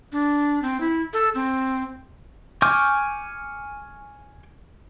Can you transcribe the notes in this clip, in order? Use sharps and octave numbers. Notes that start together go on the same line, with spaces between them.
D4
C4
E4
A4
C4
G#5 C#6 D6 F6 G6